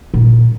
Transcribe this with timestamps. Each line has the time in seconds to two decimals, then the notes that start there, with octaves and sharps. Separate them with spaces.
0.14 A#2